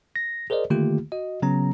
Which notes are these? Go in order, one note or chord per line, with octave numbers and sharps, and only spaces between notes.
A#6
G#4 A#4 C5 D5 D#5
D3 D#3 A3 A#3 F4 G4
F#4 D#5
C#3 F#3 B3 C#4 A#5